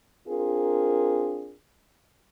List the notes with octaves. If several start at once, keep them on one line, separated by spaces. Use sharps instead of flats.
C4 D4 F4 G#4 A#4